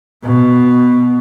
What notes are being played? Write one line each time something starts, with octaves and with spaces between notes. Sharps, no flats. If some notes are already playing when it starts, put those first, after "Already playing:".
B2